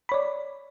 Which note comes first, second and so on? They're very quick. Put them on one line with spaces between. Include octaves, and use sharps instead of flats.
B5 C#5 D5